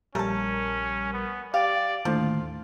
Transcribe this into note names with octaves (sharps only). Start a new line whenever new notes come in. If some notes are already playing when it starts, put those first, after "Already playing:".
A#1 G3 A3 C#4 A#4 A5
B3
G4 D5 F5
D#2 A2 D3 F3 F4